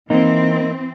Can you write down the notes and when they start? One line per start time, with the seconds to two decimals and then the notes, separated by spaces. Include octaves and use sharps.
0.10 E3 A#3 C4 D#4